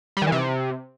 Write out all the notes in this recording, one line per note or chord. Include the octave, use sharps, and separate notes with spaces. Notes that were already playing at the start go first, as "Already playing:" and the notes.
G3
D#3
E3
C3